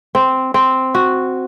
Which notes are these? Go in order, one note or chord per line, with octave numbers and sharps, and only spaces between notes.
C4
C4
F#4